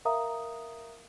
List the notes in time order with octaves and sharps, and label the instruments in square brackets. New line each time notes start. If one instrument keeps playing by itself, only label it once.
[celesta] A#4 E5 F5 A#5 D#6